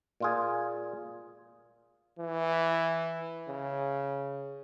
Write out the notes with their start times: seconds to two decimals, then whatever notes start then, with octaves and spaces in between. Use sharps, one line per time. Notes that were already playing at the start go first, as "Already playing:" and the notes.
0.20 A#2 F4 G#4
2.19 E3
3.48 C#3